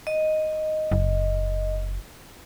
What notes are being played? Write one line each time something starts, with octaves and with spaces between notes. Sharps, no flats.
D#5
F#1